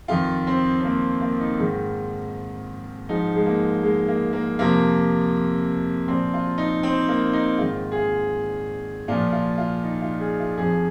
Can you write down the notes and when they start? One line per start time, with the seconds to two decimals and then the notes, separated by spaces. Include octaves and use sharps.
0.08 F2 D#3 F4
0.47 C4
0.80 C4
0.84 A#3
1.21 A#3
1.40 D#4
1.59 G#2 D#3 F4
3.09 G#2 F3 D#4
3.35 G#3
3.46 A#3
3.83 G#3
4.08 A#3
4.33 A#3
4.59 F2 C3 F3 A#3
6.08 A#2 F3 C4
6.34 F4
6.58 D#4
6.83 C4
7.08 A#3
7.33 D#4
7.58 G#2 D#3 F4
7.92 G#4
7.96 F4
9.08 A#2 F3 F4
9.32 F4
9.58 F4
9.84 D#4
10.02 F4
10.20 G#4
10.40 F4
10.57 F2 F3 G#4